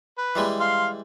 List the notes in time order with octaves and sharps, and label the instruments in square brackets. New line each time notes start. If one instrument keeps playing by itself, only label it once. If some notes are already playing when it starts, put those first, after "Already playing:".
[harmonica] B4
[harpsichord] E3 G3 G#3
[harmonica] F5 C6